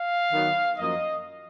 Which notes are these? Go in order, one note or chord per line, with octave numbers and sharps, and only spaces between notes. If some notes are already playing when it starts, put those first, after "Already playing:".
Already playing: F5
D#3 F#3 B3
F#2 F3 A#3 D#5